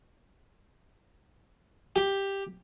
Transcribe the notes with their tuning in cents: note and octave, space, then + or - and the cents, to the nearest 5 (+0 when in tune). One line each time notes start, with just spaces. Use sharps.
G4 +5